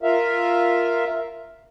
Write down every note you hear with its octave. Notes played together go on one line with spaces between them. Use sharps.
F4 A#4 E5 F5